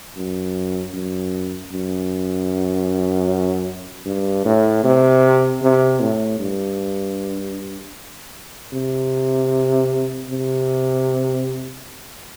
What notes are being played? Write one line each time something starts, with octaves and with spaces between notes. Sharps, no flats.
F#2
F#2
F#2
G2
A2
C3
C3
A2
G2
C3
C3